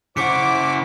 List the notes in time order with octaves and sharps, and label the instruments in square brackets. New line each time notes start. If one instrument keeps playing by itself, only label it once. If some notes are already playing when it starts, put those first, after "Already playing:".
[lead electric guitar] C#3 F#5 [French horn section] E4 C5 [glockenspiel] C#6 B6 C#7 [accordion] D6